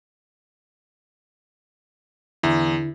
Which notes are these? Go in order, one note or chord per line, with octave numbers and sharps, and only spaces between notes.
E2 D3 E4